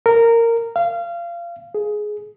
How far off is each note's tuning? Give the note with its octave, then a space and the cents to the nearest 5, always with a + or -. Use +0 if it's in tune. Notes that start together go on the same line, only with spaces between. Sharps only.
A#4 -15
F5 -25
G#4 +15